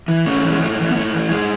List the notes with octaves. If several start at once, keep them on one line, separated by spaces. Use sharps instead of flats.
E3
G#2 A3 C#4
E3
G#3
G#2 A3
E3
B3
G#2 A3
E3
A2 G#3